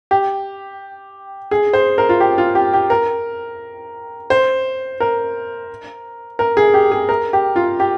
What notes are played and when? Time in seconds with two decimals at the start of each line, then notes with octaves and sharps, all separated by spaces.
0.11 G4
1.51 G#4
1.73 C5
1.98 A#4
2.09 F4
2.20 G4
2.38 F4
2.55 G4
2.73 G4
2.90 A#4
4.30 C5
5.00 A#4
6.39 A#4
6.57 G#4
6.74 G4
6.92 G#4
7.09 A#4
7.33 G4
7.56 F4
7.80 G4